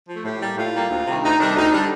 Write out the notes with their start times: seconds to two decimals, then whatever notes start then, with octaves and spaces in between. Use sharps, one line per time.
0.08 F3 A3
0.25 A2 G4
0.41 G3 A#3
0.57 A2 F4
0.74 G3 A#3
0.90 D2
1.07 C3 D#3 G3
1.23 D2 D#4
1.40 C3 D#3 G3 D4
1.56 D2 D#4
1.72 D3 G3 D4